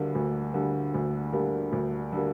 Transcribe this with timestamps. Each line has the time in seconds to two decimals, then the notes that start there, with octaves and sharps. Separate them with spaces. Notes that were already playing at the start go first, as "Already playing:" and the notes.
Already playing: D2 D3 G3 A#3
0.15 D2
0.54 D3 G3 A#3
0.94 D2
1.33 D3 G3 A#3
1.73 D2
2.13 D3 G3 A#3